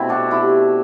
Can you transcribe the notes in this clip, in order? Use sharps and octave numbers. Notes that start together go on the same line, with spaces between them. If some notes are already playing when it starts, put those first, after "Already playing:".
Already playing: B2 A3 C4 E4
D4 F#4
E4 G4